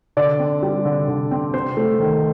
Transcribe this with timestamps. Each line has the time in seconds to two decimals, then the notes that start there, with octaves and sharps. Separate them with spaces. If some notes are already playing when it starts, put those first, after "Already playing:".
0.17 D3 D5
0.39 C4
0.63 G3
0.85 D3
1.08 D3
1.31 C4
1.54 C3 C5
1.77 A3
2.00 D#3